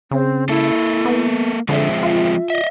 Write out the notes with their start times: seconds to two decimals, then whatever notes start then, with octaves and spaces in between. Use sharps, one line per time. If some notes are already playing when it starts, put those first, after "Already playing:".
0.11 C#3 C4
0.49 A#3 E4 A4
1.05 B3
1.69 D3 F3 G#3 C4 E5
2.03 F4
2.50 D#5 E5